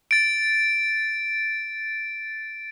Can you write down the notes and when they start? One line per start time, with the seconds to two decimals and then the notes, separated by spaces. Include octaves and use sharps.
0.11 A6 D7